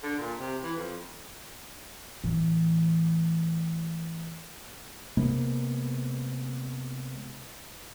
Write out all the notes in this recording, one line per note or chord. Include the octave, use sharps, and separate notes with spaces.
D3
A#2
C3
E3
F2
A2 E3
C3 G#3 A#3 B3